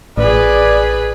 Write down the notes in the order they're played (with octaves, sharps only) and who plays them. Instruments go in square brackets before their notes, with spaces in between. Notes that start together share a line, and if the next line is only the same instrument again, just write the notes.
[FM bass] A1 [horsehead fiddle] G#4 B4 [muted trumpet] D5